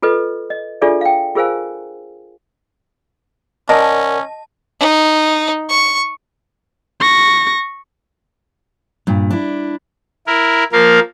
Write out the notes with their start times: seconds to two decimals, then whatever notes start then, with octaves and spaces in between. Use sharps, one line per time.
0.03 F4 A4 B4 D#5
0.50 D#5
0.81 D4 F4 G#4 A4 D5 E5
1.01 F5 G5
1.35 F4 G#4 A#4 C5 F5 G#5
3.69 C#4 A#4 D5 D#5 F#5 A5
4.80 D#4
5.69 C#6
7.00 C#6 A#6
9.07 G2 A#2
9.30 D4 E4
10.27 E4 A#4
10.72 F3 A#3 A#4 F5